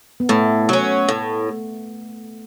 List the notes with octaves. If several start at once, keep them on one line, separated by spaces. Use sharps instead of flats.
B3
A2 A3
F#3 C#4
A2